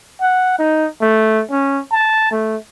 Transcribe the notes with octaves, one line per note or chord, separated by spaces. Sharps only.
F#5
D#4
A3
C#4
A5
A3